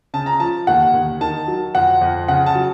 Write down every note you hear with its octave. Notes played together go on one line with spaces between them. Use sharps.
C#3 A5
A#5
F3 A5
D#2 F#5
D#2
D#3 A5
F#3
F2 F#5
F2
C#3 F#5
A5
F#3